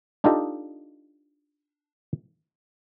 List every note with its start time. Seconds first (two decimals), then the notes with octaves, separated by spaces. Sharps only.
0.24 D4 D#4 F4 G4 A4 D#5